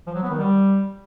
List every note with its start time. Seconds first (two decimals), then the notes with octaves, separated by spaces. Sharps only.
0.07 F3
0.14 F#3
0.22 B3
0.30 D#3
0.38 G3